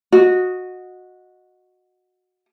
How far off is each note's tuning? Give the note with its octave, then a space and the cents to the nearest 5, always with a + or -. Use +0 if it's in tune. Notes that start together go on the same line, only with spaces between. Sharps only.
F#4 -15 D#5 +0